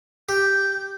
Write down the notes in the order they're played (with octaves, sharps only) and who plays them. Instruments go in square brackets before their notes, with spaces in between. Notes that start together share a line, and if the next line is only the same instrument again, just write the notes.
[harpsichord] G4 [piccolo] G6